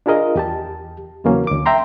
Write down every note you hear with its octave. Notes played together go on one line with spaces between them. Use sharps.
D4 F4 G#4 A#4 D#5
E2 G4 A5
E2 C#3 E3 F#3 A#3 C#4
D2 D6
E5 G5 A#5 C6